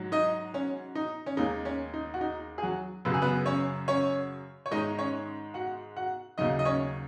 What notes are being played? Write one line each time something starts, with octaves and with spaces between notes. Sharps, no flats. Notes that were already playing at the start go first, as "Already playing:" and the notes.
Already playing: G#2 F#3
D#4 D#5
C#4
D#4
C#4
D#2 D#3 G#3 D#4
C#4
D#4
F#4
D#4
G#4
F#3 F#4
F#2 C#3 F#3 B4
G#4
B3 B4
C#4 C#5
C#4 C#5
C#5
G#2 D#3 G#3 D#4 D#5
C#4 C#5
F#4 F#5
F#4 F#5
D#2 C#3 F#3 D#4 D#5
D#5
C#4 C#5